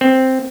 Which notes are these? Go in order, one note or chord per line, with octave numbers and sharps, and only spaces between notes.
C4